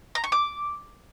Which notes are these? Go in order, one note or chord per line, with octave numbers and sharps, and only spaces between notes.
A#5
C#6
D6